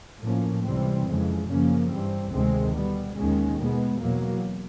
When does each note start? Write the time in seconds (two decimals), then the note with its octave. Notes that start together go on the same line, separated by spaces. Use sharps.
0.21 A2 F3 A#3 C#4
0.64 C#2 C3 E3 G3 C4
1.06 F2 C#3 E3 G#3
1.47 F#2 C#3 F3 A#3 C#4
1.90 G2 E3 G3 C4
2.31 D2 C3 D#3 G#3 C4
2.73 B2 G3 B3
3.16 D#2 D#3 G#3 C#4
3.57 B2 G#3 B3
3.99 E2 B2 F#3 A#3